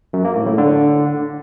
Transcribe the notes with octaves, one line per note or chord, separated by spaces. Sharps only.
F#2
A#3
A2
A2
D3